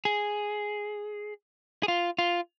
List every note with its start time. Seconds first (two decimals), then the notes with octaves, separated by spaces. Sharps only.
0.05 G#4
1.83 G#4
1.88 F4
2.19 F4